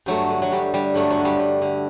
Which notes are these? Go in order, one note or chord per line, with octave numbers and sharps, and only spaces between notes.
G2 F#3 A3
D3
F#3
G2 G3
D3 G3
G2 F#3 A3
F#3
D3
G3
G2
D3